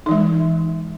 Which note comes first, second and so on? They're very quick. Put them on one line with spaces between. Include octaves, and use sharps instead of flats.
D#4 E3 G#3